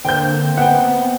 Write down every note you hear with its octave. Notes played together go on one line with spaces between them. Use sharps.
D3 A#3 C4 C5 G5 G6
B3 E5 F#5 G5